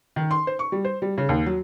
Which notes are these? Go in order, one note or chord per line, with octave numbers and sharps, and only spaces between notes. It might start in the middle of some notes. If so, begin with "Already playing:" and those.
D#3
C6
C5
C#6
G3
C5
G3
C#3
D#2
F#3